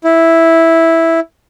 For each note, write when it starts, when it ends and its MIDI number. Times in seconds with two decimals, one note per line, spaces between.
0.04 1.20 64